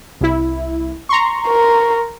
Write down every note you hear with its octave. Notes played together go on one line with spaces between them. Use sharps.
C2 E4
A#5 C6 C#6
A#4